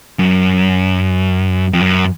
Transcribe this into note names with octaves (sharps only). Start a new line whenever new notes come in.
F#2
F2
F#2